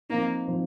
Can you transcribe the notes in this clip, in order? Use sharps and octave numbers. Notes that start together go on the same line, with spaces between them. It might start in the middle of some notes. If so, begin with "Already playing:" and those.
F3 A#3 C4 D#4
F3 C4 D#4